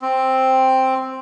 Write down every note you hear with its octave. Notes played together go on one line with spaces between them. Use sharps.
C4